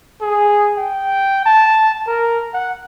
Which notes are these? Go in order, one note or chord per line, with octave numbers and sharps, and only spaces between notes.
G#4
G5
A5
A#4
F#5